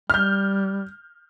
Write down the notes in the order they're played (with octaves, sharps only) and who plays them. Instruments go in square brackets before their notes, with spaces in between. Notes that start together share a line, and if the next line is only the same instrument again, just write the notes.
[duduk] G3 [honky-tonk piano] F6 G6